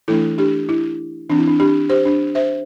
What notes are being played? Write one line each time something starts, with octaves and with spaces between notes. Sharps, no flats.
E3 A3 D4 E4 A4
D4 G4
E4
E3 C4 D4
E4
D4
D4 G4
G4 C5
D4
C5 E5